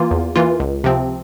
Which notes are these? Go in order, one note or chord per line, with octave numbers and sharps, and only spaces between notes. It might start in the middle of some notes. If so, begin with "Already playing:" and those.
Already playing: E3 A#3 F4
E2
E3 A#3 F4
C#2
C3 F3 C4